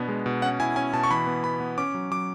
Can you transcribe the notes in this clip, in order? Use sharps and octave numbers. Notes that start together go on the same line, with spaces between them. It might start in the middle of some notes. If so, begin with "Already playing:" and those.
Already playing: B2 B3 D4
G#3
B2
C#4 F#5
E4 G#5
C#4 G#5
B2 A5
C#6
E3 B5
B3
B3 B5
B3
C#4 D6
F#3
F#3 D6